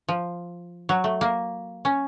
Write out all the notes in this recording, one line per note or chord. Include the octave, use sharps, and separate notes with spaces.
F3
F#3
A3
A#3
C#4